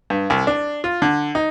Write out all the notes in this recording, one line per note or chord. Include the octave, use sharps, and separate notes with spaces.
G2
C2
D4
F4
D3
D#4